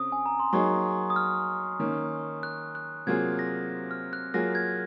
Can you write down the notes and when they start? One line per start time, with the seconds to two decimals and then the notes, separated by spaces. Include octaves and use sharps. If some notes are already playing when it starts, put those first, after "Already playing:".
Already playing: C#3 C4 D#6
0.12 G#5
0.26 A#5
0.40 C6
0.53 F#3 A#3 D#4 G#4 C#6
1.10 D#6
1.16 F6
1.79 D#3 A#3 C#4
2.43 F#6
2.75 F#6
3.07 C3 F#3 A#3 F4 G#4 G#6
3.39 A#6
3.91 F6
4.13 F#6
4.34 F#3 A#3 F4 G#4 A#6
4.55 G#6